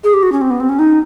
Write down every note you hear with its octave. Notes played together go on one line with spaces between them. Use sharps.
G#4
G4
F#4
C#4
C4
B3
C4
C#4
D#4